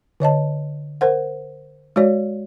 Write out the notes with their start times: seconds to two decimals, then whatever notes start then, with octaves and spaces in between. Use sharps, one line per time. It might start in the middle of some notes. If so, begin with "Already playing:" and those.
0.20 D3 C#5 D#5 A5
1.01 A#4 C5 F#5
1.96 G#3 F#4 C#5 D5